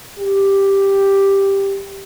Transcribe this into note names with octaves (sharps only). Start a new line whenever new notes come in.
G4